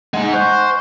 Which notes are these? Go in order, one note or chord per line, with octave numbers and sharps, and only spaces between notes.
G#3 D#4 F#5 G#5
C5 C#6 F#6 G6